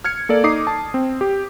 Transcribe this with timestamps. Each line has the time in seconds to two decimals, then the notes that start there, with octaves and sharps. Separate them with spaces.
0.04 F6 G#6 C#7
0.29 A#3 A4 D5
0.44 D#4 D6 D#6 C7
0.67 A5
0.94 C4
1.21 G4